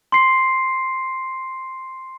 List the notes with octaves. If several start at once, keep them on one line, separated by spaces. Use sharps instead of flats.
C6 C7